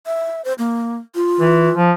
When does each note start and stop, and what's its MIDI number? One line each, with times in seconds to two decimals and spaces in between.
0.06 0.42 76
0.45 0.53 72
0.59 0.98 58
1.15 1.78 65
1.40 1.70 52
1.75 1.92 53